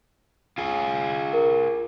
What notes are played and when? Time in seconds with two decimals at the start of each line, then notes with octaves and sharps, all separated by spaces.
0.58 F4 G#4
1.33 A#4